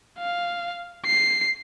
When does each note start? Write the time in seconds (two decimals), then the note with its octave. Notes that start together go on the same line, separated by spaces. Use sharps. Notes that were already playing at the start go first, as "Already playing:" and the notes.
0.18 F5
1.06 C7